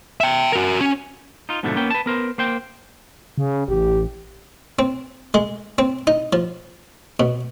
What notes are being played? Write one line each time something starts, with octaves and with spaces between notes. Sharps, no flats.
E5 G5
F#4 A#4
C#4
D#4 F4
G#2 B2 D3 F3 A3
A#3 B3 C#4 G5
B4 A5
B3 A#4 C5
A#3 C5 G5
C#3
A1 G4
C4
G#3
C4
D#4
F3
B2